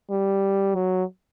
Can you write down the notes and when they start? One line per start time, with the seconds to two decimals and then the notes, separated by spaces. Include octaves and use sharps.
0.10 G3
0.75 F#3